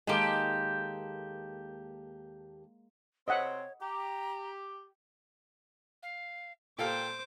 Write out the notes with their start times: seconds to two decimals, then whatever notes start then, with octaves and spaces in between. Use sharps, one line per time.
0.07 D#2 G#3 A#3 G4 A4
3.28 C3 C4 C#5 D#5 E5 F#5
3.81 G4 A#5
6.02 F5
6.78 A#2 A4 C5 F5 G5 D6